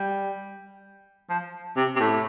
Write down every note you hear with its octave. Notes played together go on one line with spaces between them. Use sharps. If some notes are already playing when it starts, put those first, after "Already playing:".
Already playing: G3
F3
C3
C3
A2